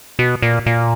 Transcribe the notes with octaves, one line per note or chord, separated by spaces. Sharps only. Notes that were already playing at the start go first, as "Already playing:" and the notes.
B2
A#2
A#2